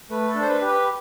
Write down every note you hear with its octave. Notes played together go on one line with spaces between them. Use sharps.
A3 B4
A4
D4
C5
B4
G4
B4